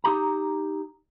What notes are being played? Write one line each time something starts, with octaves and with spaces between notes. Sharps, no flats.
D#4 G4 A#5